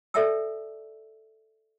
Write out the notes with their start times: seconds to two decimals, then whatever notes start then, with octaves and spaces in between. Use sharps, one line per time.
0.14 A4 D5 E5 G5 A5 E6